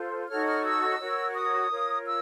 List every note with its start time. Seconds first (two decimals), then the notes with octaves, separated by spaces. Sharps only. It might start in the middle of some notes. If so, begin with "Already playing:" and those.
Already playing: F4 A4 C5
0.28 D#4 F#4 A4 C#5 F6
0.46 F6
0.64 E6
0.99 F#4 A#4 C#5
1.35 D#6
1.70 F4 A#4 C#5
2.06 E6